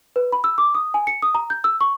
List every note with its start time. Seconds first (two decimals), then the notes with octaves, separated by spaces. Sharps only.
0.16 B4
0.32 B5
0.44 E6
0.58 D6
0.75 D#6
0.94 G#5
1.07 C#7
1.22 D#6
1.35 A#5
1.50 G6
1.64 E6
1.81 C#6